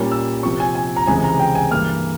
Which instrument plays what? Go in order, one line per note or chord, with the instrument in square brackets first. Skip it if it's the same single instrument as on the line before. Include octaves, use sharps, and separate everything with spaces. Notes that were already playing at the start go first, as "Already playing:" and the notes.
Already playing: [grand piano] A#2 G3 A#3 C#4
E6
C3 F3 C4 C#6
G#5
G#5
A#5
C#2 C3 E3 G#3 G#5
A#5
G5
G#5
G2 E3 A#3 F6